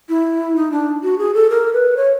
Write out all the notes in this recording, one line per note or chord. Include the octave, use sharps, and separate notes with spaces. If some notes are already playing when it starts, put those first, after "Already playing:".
E4
D#4
D4
F#4
G#4
A4
A#4
B4
C#5